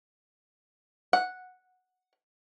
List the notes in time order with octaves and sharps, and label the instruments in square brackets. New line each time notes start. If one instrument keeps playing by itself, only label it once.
[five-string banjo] F#5